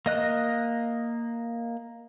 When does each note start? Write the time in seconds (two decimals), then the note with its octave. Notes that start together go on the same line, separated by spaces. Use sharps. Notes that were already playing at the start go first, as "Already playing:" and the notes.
0.06 A#3 D#5 F#6